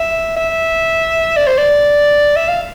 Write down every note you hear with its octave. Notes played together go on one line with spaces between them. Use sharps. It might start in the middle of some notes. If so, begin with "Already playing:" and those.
Already playing: E5
E5
D5
C5
D5
E5
F5